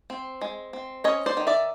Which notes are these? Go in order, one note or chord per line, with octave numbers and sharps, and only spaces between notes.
C4
G#3
C4
C#4 C#5 D#5
C5 D5
D#3
D5 E5